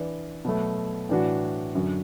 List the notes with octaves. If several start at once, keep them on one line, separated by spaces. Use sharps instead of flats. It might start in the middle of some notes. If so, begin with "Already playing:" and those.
Already playing: E3 D4 B4 D5
B2 F#3 A3
A2 E3 D4 F#4
F#2 D3 F#3